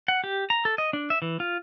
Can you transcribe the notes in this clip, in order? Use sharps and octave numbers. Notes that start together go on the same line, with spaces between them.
F#5
G4
A#5
A4
D#5
D4
E5
E3
F4